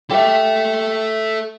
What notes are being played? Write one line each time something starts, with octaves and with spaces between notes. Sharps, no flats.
G4 A4 E5 F5